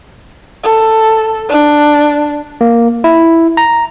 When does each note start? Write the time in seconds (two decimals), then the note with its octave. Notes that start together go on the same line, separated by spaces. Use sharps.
0.64 A4
1.49 D4
2.61 A#3
3.04 E4
3.57 A#5